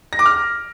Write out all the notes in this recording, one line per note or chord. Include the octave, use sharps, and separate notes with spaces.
A#6
D6
F6